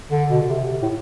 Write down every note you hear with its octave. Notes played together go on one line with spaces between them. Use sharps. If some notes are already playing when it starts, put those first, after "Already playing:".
D3
B2
D3
C3
A2